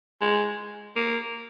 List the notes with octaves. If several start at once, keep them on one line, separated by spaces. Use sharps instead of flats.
G#3
A#3